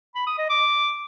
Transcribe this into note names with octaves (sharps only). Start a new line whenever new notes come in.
B5
D#6
D#5
D6